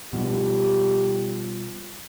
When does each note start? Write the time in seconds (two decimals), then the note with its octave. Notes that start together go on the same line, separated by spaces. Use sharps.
0.13 B2 F3 G3 G4